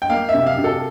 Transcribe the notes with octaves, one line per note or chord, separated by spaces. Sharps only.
G5
A#3 F5
E5
C3
F5
C3
A4